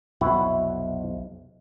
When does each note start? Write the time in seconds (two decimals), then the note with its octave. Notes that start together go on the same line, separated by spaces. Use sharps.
0.21 B1 F2 C3 E4 F#4